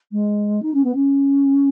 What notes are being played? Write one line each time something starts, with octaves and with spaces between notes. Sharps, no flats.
G#3
D#4
C#4
B3
C#4